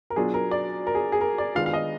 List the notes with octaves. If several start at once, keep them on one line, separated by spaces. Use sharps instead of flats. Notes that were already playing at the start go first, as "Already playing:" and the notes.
A#4
B2 F#3 D4 F4 G#4
A#4
D5
A#4
G#4
G#4
A#4
D5
D#3 G#3 B3 D4 F4 F5
F5
D#5